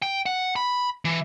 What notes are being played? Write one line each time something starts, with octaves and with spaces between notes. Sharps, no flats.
G5
F#5
B5
E3